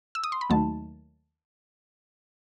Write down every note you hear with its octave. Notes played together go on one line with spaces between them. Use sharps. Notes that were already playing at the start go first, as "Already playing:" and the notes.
E6
D#6
C6
B5
D#2 D#3 F#3 A3 A5